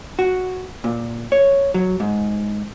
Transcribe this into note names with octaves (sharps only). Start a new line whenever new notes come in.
F#4
A#2
C#5
F#3
G#2